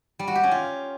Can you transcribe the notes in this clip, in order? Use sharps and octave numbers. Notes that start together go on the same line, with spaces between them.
G3
F#4
G4
C#4
F4